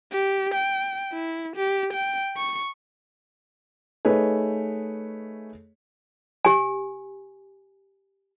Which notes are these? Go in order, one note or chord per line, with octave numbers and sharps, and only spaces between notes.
G4
G5
E4
G4
G5
C#6
A3 D#4 G#4 B4 C#5
G4 G#5